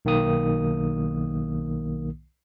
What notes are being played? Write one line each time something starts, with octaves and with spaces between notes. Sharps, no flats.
B1 D#3 A#3 D#6